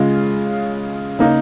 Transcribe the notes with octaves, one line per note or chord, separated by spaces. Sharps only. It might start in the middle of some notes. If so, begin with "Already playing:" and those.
Already playing: C#3 G#3 F4
C#3 A#3 D#4